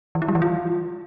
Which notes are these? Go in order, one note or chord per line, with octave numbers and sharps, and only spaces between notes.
E3
E4
G3
E3
F4